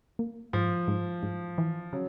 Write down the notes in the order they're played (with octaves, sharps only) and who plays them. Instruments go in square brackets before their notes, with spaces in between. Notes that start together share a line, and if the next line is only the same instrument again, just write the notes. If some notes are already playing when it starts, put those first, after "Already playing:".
[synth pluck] A#3
[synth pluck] G#2 [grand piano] F3
[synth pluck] G#2
G#2
E3
[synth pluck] C#3 [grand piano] F#3